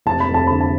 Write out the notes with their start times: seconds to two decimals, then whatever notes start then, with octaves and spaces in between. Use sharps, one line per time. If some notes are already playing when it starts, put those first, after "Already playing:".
0.06 F1 A5
0.20 B5
0.29 F2
0.34 A5
0.47 D3 B5
0.61 A5